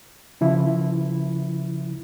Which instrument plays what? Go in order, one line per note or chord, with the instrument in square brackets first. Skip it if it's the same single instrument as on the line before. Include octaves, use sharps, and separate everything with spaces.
[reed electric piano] C#3 F3 E4